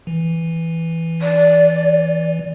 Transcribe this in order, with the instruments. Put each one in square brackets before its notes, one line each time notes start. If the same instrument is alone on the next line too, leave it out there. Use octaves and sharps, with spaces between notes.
[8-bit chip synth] E3
[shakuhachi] D5